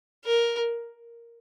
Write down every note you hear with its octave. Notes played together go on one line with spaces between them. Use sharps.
A#4